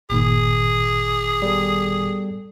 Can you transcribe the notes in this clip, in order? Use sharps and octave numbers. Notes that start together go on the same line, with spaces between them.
G1 A#2 D#3 G#4
G3 B3 A4